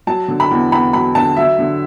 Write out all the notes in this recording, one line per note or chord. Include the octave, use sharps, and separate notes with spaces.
F#3 A5
D3
B5
E2
E2 B5
F#3 B5
D3 A5
F#3 E5
D3